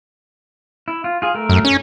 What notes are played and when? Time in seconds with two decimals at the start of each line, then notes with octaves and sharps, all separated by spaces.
0.88 E4
1.04 F4
1.22 F4 G#4
1.35 A3 A#4
1.49 F#2
1.65 C#4